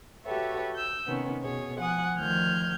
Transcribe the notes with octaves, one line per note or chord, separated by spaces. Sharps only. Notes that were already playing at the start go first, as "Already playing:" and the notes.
F#4 G4 A4 B4 C#5 E5
E6 G6
C3 D#3 B3 C#4
B2 G#4 C#5
F3 F#5 G#5 D#6
D2 D#3 F3 F6 G6 G#6